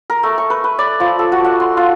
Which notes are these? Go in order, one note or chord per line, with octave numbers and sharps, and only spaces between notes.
A#4
A3
C#6
B4
B4
D5
F3
A4
F#4
F#5
C6
F4